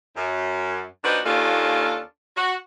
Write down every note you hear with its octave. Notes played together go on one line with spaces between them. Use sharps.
F#2
A#2 D4 D#4 F#4 B4 C5
D#2 A#3 C#4 D4 F4 A4
F#4